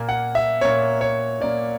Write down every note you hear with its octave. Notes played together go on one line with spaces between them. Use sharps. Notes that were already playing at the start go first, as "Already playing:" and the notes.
Already playing: A#2 A#3
F#5
E5
A#2 A#3 C#5
C#5
A#2 A#3 D5